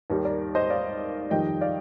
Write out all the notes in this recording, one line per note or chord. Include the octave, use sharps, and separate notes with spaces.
D#2 D#3 G3
A#4 D5
C5 D#5
D5 F5
F2 D#3 G3 D#5 G5
D5 F5